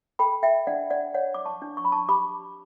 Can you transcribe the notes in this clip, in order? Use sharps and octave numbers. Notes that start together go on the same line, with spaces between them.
A4 G5 B5
E5 G5
D4 D5 F#5
D5 F#5
C#5 D5 F#5
D6
A5 C#6
D4
C#6
B5
A5 C#6
G4 B5 D6